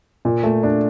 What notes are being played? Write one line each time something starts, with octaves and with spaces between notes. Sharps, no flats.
A#2
A3
D4